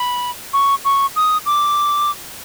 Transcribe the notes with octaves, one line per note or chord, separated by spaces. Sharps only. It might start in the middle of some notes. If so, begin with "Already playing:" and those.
Already playing: B5
C#6
C#6
D#6
D6